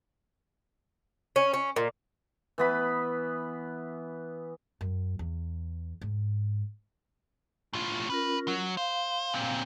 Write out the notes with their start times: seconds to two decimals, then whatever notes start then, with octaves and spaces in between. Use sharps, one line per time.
1.36 C#4
1.54 C#4
1.76 A#2
2.58 E3 B3 B5
4.81 F#2
5.19 E2
6.01 G#2
7.73 A2 F4
8.10 C#4 F4 A#4 B4
8.48 F#3
8.77 C5 F5
9.34 A#2 C4